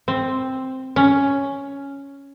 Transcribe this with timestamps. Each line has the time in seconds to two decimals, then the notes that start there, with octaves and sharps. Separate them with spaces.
0.08 C4
0.96 C#4